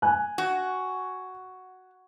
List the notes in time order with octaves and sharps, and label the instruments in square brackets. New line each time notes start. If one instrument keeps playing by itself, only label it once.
[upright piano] G#5 F#6
[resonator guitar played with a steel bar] F#4